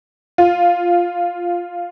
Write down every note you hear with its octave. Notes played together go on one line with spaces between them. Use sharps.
F4